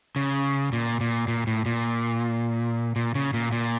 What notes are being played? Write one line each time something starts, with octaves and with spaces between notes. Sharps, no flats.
C#3
A#2
A#2
A#2
A2
A#2
A#2
C#3
A#2
A#2